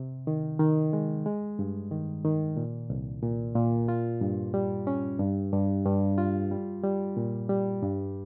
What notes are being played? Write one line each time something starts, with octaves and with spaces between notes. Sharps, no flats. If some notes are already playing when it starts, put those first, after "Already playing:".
Already playing: C3
D#3
D#3
G#3
G#3
G2
D#3
D#3
A#2
C2
A#2
A#2
F4
G2
G3
C#4
G2
G2
G2
F4
G3
G3
A#2
G3
G2